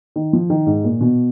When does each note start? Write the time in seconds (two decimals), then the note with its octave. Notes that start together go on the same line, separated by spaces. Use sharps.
0.16 D#3
0.33 F3
0.50 D#3
0.66 G#2
0.84 A#2
1.01 B2